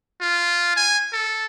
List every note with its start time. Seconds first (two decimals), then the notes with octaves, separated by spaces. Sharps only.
0.21 F4
0.76 G#5
1.13 A4